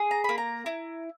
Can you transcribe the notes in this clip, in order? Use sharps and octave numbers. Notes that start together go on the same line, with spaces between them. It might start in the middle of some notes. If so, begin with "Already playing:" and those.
Already playing: G#4
A#5
A#3 B5
A#5
E4